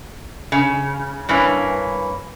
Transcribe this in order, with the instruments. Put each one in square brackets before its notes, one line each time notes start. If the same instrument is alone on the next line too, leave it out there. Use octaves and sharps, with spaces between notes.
[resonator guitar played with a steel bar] C#3
G2 E3 A#3 C#4